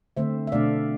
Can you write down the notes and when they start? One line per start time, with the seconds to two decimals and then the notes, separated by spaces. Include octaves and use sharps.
0.17 D3 A3 C4 C5 E5
0.47 E5
0.52 B2 A3 D4 D5 F5